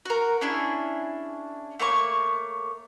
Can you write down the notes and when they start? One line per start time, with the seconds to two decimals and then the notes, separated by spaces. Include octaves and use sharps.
0.05 F#4 A#4
0.41 C#4 D4 E4 G#4
1.80 A3 A#3 C#5 C#6